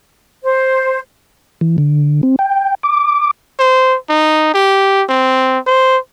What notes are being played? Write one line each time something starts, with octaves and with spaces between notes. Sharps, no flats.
C5
E3
D3
C4
G5
D6
C5
D#4
G4
C4
C5